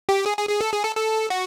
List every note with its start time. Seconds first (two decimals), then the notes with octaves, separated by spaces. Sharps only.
0.09 G4
0.26 G#4
0.38 G#4
0.49 G#4
0.61 A4
0.73 G#4
0.84 A4
0.96 A4
1.30 F#4